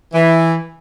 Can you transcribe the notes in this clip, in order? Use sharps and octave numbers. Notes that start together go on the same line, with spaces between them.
E3